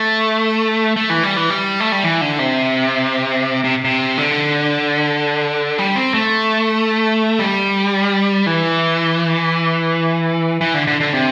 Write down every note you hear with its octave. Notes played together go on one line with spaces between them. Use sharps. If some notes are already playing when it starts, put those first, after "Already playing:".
Already playing: A3
A3
E3
G3
E3
G3
A3
G3
E3
D3
C3
C3
C3
D3
G3
C4
A3
G3
E3
E3
D3
D3
D3
C3